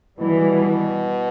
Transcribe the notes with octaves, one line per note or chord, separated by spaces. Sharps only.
B2 E3 G3